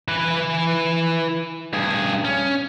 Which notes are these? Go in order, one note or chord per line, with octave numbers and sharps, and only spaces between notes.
E3 B4
G2 G#4
C#4